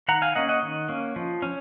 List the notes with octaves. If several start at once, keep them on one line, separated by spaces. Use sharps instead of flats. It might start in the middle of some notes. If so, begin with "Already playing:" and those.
D#3 F#5 A#5
F5 G#5
A#3 C#4 D#5 F#5
D#5 F#5
D#3
A#3 C#4
F3
C#4